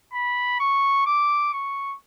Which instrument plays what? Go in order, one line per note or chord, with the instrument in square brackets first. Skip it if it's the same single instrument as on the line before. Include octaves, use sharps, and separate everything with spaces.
[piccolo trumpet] B5
C#6
D6
C#6